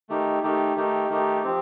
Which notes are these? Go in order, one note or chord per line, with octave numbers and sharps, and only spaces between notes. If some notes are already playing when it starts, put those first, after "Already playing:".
D#3 A3 D#4 G4
D#3 A3 D#4 G4
D#3 A3 D#4 G4
D#3 A3 D#4 G4
F3 C4 G4